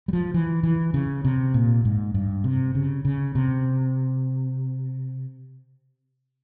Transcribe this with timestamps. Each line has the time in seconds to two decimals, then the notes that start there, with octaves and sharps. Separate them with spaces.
0.08 G3
0.13 F3
0.34 E3
0.63 E3
0.94 C#3
1.25 C3
1.54 A#2
1.85 G#2
2.14 G2
2.44 C3
2.75 C#3
3.05 C#3
3.35 C3